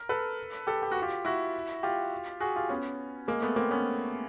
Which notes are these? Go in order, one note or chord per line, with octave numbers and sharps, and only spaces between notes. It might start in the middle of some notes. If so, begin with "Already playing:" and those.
Already playing: A#4
A4 B4
G4 A4
G4
F#4
F4 G4
E4 F#4
F4 G4
F#4 G#4
F4 G4
B3 C#4
G#3 A#3
A3 B3
A#3 C4
B3 C#4